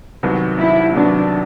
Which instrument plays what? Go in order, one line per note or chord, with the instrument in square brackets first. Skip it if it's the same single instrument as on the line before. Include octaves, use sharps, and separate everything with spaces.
[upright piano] C2 C3 D#3 F#3 B3
[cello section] E4
[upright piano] C2 C3 D#3 F#3 B3 [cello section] D4